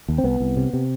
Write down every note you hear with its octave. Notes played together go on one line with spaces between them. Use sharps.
D#2
C4
C2 B3
C2
C3
C3